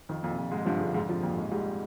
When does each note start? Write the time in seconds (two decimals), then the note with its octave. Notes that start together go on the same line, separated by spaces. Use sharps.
0.09 F2 D#3
0.23 F2 A#2
0.30 C3
0.38 F2
0.51 G#2 G#3
0.65 G2 F3
0.80 G#2 D3
0.94 F2 G#2
1.09 C3 F3
1.23 F2 A#2
1.37 G#1
1.51 G#2 G3